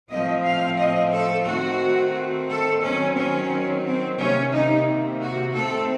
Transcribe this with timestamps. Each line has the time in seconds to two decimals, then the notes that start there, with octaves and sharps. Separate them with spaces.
0.10 A2 F3 A3 C4 D#5
0.45 F5
0.79 D#5
1.13 A4
1.47 D#3 A3 C4 F#4
2.49 A4
2.83 D#3 F#3 C4 C#4
3.17 C#4
3.86 C4
4.19 C3 D#3 A#3 C#4
4.53 D#4
5.22 F#4
5.55 D#3 A3 C4 A4